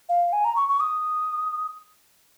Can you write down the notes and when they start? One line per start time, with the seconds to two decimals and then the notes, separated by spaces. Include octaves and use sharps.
0.09 F5
0.32 G#5
0.45 A#5
0.56 C#6
0.69 C#6
0.80 D#6